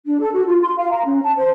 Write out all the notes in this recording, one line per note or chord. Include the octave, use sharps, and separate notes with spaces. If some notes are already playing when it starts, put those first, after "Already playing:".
D4
A4
F#4
F4
C6
F5
A#5
C#4
A5
C5